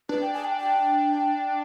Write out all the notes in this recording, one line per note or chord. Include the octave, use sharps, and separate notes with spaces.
D4 B4
G5
G#5
G5
G5